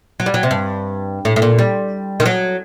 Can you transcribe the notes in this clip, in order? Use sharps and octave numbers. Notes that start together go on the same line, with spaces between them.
F#3
G3
F#3
C3
G2
A2
A2
A#2
G3
D#3
F#3